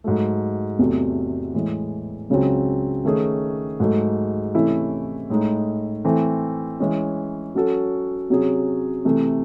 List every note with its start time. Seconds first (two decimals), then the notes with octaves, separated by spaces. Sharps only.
0.04 G#2 F#3 A3
0.79 E2 C3 F#3 A3
1.54 A2 E3 G#3
2.30 C#2 C#3 F#3 C4
3.05 D#3 A3 C#4 G#4
3.80 G#2 F#3 A3
4.54 C3 E3 A3 C#4 E4
5.30 A2 G#3 D#4
6.05 E3 A3 C4
6.80 E3 G#3 C#4
7.55 F#3 C#4 F#4 A4
8.30 C3 F#3 C#4 G#4
9.05 C3 E3 A3